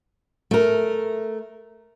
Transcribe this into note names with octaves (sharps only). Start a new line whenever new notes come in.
A3 A#4